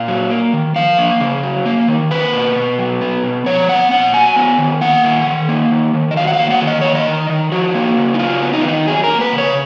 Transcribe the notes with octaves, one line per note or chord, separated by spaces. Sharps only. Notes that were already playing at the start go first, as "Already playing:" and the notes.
Already playing: A#2 F5
F#3
A#3
D#3
F3 F5
A#3
C#3
F#3
A#3
D#3
A#3 B4
B2
B2
F#3
B3
B2
F3 C#5
B3 F#5
A#2 F#5
F#3 G#5
B3
D#3
A#3 F#5
D#3
D#3
A#3
D#3
D#3
D#5
F#3 F5
F#5
F5
A#3
F#5
D#3
D#5
A#3 C#5
D#5
D#3
D#3
F3 F#4
A#3
C#3
D#4
F#3 F4
B3
D#4
F4
D#3 D#4
F#3 G#4
A#4
A#3
B4
C#3
C#5